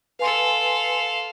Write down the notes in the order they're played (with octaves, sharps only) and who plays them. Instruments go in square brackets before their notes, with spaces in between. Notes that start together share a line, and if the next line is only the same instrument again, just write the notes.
[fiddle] A4 F5 [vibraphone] B4 G#5 C6